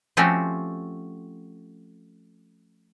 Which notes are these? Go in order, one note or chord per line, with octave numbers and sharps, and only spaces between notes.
F3 A3 C4 C#4 F#4 G4